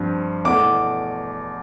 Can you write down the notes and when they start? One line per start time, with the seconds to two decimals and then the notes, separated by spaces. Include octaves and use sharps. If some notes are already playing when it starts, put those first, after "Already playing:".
Already playing: G2 F3 C4
0.45 E2 B2 A3 D6